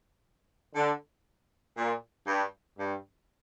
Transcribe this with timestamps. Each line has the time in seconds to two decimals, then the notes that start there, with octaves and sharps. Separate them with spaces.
0.76 D3
1.77 A#2
2.27 G2
2.79 G2